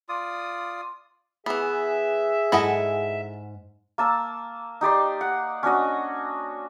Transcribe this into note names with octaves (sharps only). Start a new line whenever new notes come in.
F4 D5 D#6
E3 B3 G#4 E5
G#2 E4 A4 D#5 F#5 G#5
A#3 A5 E6
D#4 G4 D5 C6
F#5
C#4 D4 F#4 D#5